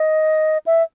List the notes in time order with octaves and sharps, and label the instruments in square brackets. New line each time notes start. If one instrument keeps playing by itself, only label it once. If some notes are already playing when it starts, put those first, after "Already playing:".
Already playing: [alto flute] D#5
E5